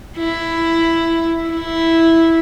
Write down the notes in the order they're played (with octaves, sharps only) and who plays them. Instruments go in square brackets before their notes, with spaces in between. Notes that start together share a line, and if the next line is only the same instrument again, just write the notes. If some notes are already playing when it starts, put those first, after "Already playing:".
[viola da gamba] E4
E4